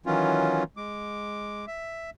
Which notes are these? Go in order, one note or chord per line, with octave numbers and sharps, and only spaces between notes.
D#3 E3 F#3 C#4 F4
G#3 D6
E5